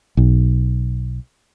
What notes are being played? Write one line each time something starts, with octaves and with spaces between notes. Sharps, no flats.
B1